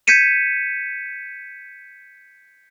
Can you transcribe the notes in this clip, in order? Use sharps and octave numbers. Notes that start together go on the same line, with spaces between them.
G6 G#6 B6 C#7 D#7 E7